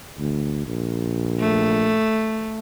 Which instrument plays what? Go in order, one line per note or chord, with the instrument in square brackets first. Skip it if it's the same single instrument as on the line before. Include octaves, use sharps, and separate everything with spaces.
[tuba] D2
A#1
[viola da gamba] A3